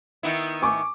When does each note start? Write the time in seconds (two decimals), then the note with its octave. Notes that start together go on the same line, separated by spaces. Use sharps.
0.23 D#3 B3 E4
0.62 G#5 C#6 D6